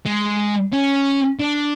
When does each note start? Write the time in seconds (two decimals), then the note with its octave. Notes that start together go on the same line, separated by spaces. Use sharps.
0.06 G#3
0.73 C#4
1.39 D4